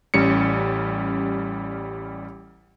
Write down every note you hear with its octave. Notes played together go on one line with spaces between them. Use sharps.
A1 G3 C#4 C#7